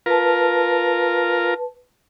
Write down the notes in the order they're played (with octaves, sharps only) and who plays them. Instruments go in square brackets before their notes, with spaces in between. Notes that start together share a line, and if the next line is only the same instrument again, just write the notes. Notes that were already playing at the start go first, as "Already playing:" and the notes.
[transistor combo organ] F4 A#4 [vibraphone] B4 A5